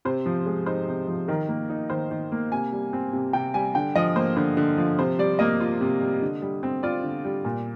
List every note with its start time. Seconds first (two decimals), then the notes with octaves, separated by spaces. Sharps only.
0.05 C3 C5
0.26 F3
0.46 G#3
0.66 D#4 C5
0.88 C3
1.08 F3
1.28 D#3 A#4
1.48 A#3
1.69 D#4
1.90 D#3 C5
2.11 D#3
2.32 A#3
2.52 C3 G#5
2.72 G3
2.93 C4
3.13 C3
3.33 C3 G5
3.54 G3 G#5
3.75 D3 G5
3.95 F3 D#5
4.16 A#3 C5
4.36 D3 C5
4.57 D3
4.77 F3
4.98 C3 C5
5.19 G3 D5
5.39 A#3 D#5
5.61 F4
5.81 C3
6.01 G3
6.22 D3
6.42 G3
6.63 C4
6.83 F4 D5
7.03 D3
7.25 G3
7.45 A#2